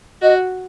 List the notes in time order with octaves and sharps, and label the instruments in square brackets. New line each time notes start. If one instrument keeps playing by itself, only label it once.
[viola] F#4 [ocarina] D#5